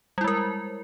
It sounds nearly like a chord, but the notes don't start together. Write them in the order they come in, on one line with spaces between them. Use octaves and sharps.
G3 E4 G#3 A#4